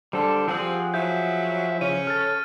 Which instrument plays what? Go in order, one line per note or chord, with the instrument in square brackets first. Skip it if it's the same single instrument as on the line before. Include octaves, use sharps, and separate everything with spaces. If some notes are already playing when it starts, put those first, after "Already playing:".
[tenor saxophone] D3 [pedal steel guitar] G3 A4 [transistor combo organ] D4 C5
[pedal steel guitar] F3 G#4 F#5 [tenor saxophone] C4 [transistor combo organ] G4
[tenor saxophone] F#3 [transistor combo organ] E4 E5 [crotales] G6
[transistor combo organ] C#3 [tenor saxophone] C#4 [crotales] D#7
[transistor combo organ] A4 [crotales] F6 A6